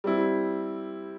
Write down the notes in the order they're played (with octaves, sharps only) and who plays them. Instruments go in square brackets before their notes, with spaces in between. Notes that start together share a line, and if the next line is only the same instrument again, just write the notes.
[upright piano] G3 C4 E4